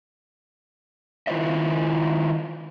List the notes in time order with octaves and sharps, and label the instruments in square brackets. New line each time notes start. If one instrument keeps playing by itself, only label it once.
[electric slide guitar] D#3 E4 F4 C5 D#5 E5